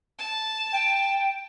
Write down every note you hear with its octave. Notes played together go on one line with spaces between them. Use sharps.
A5
G5